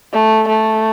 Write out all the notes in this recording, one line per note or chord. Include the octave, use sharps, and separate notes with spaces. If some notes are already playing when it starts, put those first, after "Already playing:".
A3
A3